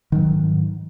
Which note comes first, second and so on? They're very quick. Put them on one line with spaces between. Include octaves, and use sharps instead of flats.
D#3 F#3 G#2